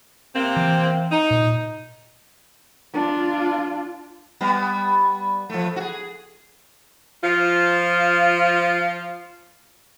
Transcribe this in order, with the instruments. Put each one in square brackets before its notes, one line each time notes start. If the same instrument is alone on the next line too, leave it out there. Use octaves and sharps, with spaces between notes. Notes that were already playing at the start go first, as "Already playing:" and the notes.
[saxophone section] C3 A#3 C4
[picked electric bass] E3
[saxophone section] D#4
[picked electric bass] A#2
[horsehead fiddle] D4 F4
[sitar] G3 B3
F3 A3
F#4 G#4
[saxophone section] F3 F4